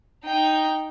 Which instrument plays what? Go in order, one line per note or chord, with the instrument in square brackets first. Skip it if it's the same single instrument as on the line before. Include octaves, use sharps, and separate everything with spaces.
[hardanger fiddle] D#4 G5